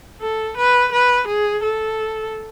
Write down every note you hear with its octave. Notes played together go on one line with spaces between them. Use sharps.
A4
B4
B4
G#4
A4